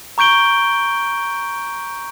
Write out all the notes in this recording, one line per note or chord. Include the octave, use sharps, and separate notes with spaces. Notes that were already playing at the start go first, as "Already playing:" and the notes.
A#5 C#6 G6 D7 G7